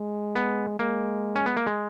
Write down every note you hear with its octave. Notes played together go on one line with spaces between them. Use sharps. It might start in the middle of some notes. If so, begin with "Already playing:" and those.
Already playing: G#3
B3
G#3 A#3
C#4
B3
A#3
G#3